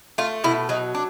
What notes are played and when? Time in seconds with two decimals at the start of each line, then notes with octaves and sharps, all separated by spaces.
0.18 A3 F4
0.44 B2 E4
0.69 F#3 D#4
0.95 D4